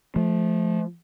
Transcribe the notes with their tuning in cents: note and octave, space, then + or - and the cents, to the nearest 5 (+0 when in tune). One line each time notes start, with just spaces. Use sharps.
F3 -10 A3 -25